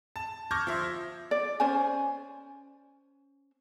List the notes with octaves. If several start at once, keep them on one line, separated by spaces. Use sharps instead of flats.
A5
C#6 D6 F6 G6 G#6 A#6
F3 E5 C6
D5
C#4 C5 G#5